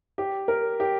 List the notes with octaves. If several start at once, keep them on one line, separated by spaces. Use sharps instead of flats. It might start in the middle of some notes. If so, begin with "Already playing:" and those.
G4
A#4
G4